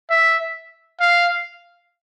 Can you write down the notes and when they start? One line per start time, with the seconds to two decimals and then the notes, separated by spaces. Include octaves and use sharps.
0.10 E5
1.00 F5